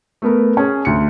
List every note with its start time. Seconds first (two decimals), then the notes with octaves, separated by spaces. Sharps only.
0.22 A3 B3 A#4
0.57 C#4 G#4
0.85 D2 C#7